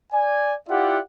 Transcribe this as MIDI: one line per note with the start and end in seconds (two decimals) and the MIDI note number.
0.12 0.54 74
0.12 0.54 80
0.69 0.99 64
0.69 0.99 65
0.69 0.99 67
0.69 0.99 74
0.69 0.99 76
0.69 0.99 78